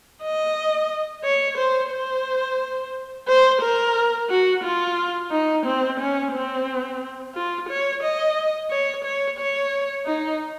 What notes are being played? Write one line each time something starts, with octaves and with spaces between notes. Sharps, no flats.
D#5
C#5
C5
C5
C5
A#4
F#4
F4
D#4
C4
C#4
C4
F4
C#5
D#5
C#5
C#5
C#5
D#4